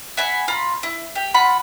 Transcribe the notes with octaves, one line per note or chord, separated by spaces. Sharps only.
E5 F#5 G#5 B5
F4 A#5 B5 F6
E4
G4
F4 F#5 B5